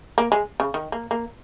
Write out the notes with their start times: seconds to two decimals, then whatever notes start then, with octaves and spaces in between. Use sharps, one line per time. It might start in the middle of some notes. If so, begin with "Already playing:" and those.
0.18 A#3
0.32 G#3
0.60 C#3
0.74 D#3
0.92 A#3
1.11 A#3